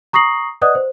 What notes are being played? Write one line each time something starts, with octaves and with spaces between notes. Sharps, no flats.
A#5 C#6 D#6 A#6 C7 F#7
B4 D5 D#5 F#5 D#6 F#6
C5